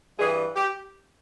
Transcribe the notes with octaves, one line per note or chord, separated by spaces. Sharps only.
G2 E3 G3 G#4
G4